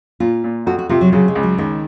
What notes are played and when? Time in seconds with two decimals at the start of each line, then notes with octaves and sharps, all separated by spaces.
0.20 A#2 F4
0.44 A#2
0.66 F2 F#4
0.79 F#4
0.89 C3 F4
1.01 F#3
1.12 C#3 F#3
1.28 G#3
1.35 C#2
1.43 F#3
1.58 C#2 D#3